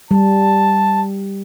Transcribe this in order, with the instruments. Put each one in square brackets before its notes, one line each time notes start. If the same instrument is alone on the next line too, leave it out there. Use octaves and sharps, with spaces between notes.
[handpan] G3 [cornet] A5